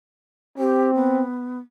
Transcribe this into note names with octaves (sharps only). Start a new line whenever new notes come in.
C4 G4
B3